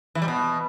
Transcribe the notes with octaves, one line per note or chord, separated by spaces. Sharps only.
E3
G3
B2